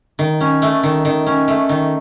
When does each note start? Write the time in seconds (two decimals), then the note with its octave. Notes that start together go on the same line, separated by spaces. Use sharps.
0.19 D#3
0.40 C#4
0.62 A3
0.83 D#3
1.05 D#3
1.26 C#4
1.48 A3
1.69 D#3